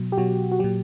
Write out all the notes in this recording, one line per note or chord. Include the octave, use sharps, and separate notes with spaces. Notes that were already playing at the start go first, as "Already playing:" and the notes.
Already playing: B2 F#3
G4
B2 F#3 F#4
F#4
A#2 F#3 G4